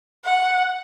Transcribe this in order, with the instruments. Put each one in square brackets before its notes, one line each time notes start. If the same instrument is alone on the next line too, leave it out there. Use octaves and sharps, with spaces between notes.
[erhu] F#5